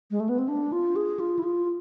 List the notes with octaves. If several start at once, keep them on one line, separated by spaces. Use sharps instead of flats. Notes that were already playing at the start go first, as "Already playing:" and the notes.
G#3
A3
B3
C4
D4
F4
G#4
F4
E4
F4